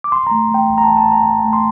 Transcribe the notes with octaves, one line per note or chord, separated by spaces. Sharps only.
D6
A#1 C6
A3 A#5
A3 G5
A#1
A#5
A#1 A5
A5
A#1
A#5
A#1
A3
C6